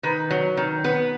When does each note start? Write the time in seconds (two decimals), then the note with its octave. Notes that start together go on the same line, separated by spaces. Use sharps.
0.03 D#3 B4
0.31 F#3
0.57 D#3
0.84 B3 B4